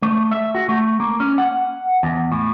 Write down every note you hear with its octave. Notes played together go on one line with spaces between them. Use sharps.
A3
E5
F#4
A3
A#3
C#4
F#5
E2
A2